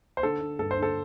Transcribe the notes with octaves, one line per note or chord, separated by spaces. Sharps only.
C5
D3 A4
D3
G2 A4
C5
D3
A4